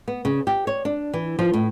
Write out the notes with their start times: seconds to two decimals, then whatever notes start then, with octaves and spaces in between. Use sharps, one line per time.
0.08 B3
0.25 C#3
0.47 G4
0.67 C#5
0.85 D4
1.14 E3
1.39 F3
1.54 A2